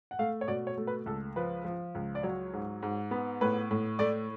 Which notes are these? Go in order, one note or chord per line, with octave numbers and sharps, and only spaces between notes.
F#5
A3 F5
C#5
B2 D5
C#5
A3
B4
C#2 A4
F3 B4
F3
C#2
D5
F#3 C#5
G#2
G#2
B3
A2 B4
A2
A3 D5